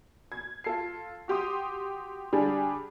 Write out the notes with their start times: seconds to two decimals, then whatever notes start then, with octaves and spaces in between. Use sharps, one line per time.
0.32 G#6
0.64 F4 A4 C7
1.28 F#4 G4 C6 D#6
2.32 D3 G3 D4 G4 G#4